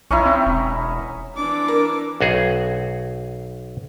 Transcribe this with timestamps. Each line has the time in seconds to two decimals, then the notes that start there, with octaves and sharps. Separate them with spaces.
0.11 B1 C#4 D#4 E4
0.26 C4
0.46 E1
1.36 E3 D4 D6
1.68 A#4
2.21 B1 F#4 G#4